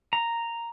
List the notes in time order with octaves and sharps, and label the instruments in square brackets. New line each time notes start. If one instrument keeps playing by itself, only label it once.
[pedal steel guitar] A#5